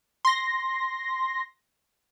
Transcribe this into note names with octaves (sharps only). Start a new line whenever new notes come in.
C6 A#6